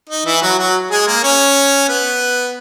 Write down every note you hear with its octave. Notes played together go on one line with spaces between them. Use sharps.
D#4
E3 E4
F#3 F#4
F#3 F#4
G#3 G#4
A#3 A#4
C#4 C#5
B3 B4